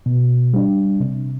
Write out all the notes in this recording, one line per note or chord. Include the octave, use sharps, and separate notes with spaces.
B2
G3 D4
C3